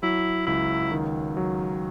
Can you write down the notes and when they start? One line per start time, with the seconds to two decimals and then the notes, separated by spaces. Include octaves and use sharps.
0.03 F#3 E4
0.47 C#2 E4
0.92 D#3
1.37 F#3